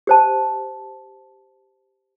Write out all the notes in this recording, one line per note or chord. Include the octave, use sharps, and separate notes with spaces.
G4 C5 A5